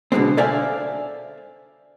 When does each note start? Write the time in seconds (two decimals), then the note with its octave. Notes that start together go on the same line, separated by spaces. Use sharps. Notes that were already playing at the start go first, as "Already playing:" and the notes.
0.12 B2 D3 F3 G#3 B3 C4
0.37 A4 C5 D5 E5 F5 G#5